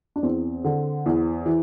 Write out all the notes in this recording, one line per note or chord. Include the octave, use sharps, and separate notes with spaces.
D4
E2 C4
D3
E2
E3